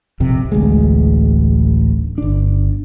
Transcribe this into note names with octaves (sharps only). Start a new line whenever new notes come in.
A#1 F2 C3
D1 A1 D2 G#3
G1 D4